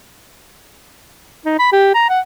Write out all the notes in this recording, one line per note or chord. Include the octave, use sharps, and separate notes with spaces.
D#4
B5
G4
A#5
F#5